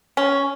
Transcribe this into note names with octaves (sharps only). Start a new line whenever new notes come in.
C#4